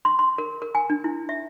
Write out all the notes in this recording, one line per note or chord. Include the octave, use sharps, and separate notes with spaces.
C6
C6
A#4
A#4
G#5
D4
E4
E5